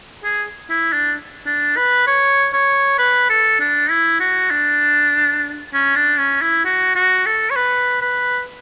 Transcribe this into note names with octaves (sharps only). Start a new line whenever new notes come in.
G#4
E4
D4
D4
B4
C#5
C#5
B4
A4
D4
E4
F#4
D4
C#4
D4
C#4
E4
F#4
F#4
A4
C#5
B4
B4